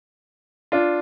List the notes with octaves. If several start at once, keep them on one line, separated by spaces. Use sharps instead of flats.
D4 F4